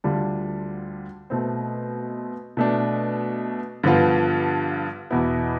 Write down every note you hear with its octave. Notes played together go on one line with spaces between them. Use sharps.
D2 D3 G3 D4 F4
B2 A3 C4
B2 A3 D4
G2 D3 F3 B3 F4
E2 B2 B3 E4